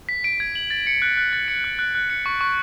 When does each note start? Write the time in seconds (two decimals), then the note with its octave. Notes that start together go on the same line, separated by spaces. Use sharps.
0.09 B6
0.24 D7
0.40 G#6
0.55 F#7
0.70 A6
0.87 C#7
1.02 F#6
1.17 F#6
1.33 A6
1.48 C#7
1.64 F#6
1.79 F#6
1.95 F#6
2.10 C#7
2.26 C#6
2.41 C#6